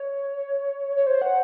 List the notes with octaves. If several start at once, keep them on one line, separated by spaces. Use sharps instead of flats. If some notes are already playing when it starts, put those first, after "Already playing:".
Already playing: C#5
C#5
C5
F#5